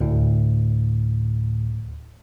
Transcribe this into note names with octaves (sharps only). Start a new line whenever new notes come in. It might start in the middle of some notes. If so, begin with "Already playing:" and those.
D2 A2